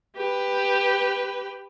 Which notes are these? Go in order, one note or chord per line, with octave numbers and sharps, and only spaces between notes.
G4 B4